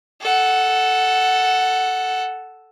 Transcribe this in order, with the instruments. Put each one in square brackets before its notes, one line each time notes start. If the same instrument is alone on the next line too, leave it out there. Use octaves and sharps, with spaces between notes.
[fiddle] A4 F#5